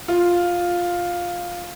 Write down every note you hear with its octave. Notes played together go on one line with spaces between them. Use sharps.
F4